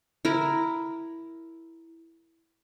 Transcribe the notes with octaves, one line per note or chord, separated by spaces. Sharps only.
E4 A#4